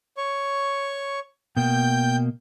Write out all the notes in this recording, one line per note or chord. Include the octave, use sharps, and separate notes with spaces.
C#5 C#6
B2 A#3 G5 G6